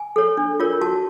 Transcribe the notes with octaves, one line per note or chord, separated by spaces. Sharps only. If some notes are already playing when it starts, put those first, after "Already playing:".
Already playing: G#5
A4 C#5
D4
F4 A#4 C#5
F#4 A5